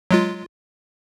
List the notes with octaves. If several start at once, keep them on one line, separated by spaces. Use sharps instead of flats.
F#3 G#3 F4